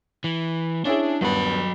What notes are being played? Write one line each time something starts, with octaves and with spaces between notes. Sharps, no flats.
E3
C#4 D4 E4 G#4
D#1 G2 F#3 B3 B5